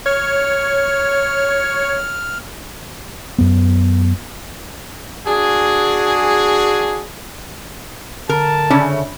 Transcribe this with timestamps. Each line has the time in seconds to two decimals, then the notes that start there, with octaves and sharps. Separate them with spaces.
0.06 C#5 F6
3.39 F#2 B3
5.26 D4 F#4 G#4
8.29 D3 A#4 A5
8.70 C#3 C#4 D4 E5